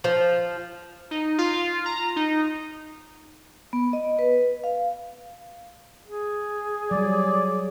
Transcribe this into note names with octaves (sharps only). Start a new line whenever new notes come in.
F3
D#4
F4
A#5
D#4
B3
D#5
B4
F5
G#4
F#3 G3 D5